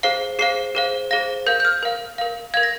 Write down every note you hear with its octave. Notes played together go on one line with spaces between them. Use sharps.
G#4 C5 F5 C7
G#4 C5 F5 C7
G#4 C5 F5
G#4 C5 F5 A#6
A#4 F5 G6
G6
F6
A#4 F5
A#4 F5
A#4 F5 G#6
A#6